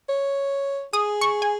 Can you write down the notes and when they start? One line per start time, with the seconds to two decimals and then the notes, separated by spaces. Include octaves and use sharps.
0.09 C#5
0.93 G#4 D#6
1.21 C#6
1.42 G#5